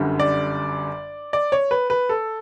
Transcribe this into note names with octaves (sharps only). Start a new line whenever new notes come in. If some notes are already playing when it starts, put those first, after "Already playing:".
Already playing: G1 F#2 D3 G3
D5
D5
C#5
B4
B4
A4